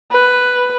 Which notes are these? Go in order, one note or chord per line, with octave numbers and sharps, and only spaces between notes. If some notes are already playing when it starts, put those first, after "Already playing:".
B4